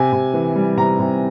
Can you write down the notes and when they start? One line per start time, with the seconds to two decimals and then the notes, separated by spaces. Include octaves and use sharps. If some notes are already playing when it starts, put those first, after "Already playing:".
Already playing: C3 G#5
0.13 C3
0.34 E3
0.56 G3
0.77 C3 A#5
0.99 C3